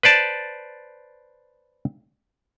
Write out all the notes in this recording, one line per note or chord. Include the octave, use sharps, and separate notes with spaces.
B4 C5 D5 A5